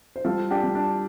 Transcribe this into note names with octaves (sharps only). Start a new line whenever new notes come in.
C5
G3 F4 A4
D4 G4
G3
D4